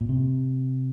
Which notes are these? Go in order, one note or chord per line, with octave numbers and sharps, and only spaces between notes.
A#2
C3